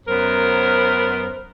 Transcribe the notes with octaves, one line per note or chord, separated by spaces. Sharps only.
F#2 B3 A#4 C5